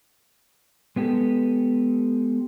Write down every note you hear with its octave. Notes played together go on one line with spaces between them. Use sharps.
G#3 B3 G4 A4